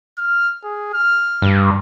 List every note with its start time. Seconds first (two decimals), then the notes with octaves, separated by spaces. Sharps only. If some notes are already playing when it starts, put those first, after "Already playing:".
0.18 F6
0.64 G#4
0.94 F6
1.42 G2